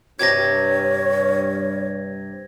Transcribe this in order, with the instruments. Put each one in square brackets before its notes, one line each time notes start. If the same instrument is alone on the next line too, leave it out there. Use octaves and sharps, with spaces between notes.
[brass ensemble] G2 [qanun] C3 G4 D6 [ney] C#5 [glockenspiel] G#6 A#6